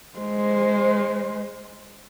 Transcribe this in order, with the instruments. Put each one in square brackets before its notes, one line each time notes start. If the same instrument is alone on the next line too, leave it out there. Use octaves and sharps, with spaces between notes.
[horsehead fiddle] G#3 C5